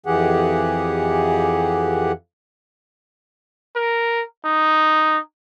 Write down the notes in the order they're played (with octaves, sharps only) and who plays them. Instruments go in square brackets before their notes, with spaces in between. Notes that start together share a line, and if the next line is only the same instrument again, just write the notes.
[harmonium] F2 E3 G4 G#4 F#5
[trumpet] A#4
D#4